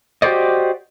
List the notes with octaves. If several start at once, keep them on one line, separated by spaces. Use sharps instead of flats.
F#4 G4 A4 C5 D5 D#5